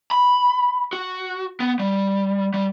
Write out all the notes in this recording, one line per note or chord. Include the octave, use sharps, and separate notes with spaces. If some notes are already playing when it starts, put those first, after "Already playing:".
B5
F#4
B3
G3
G3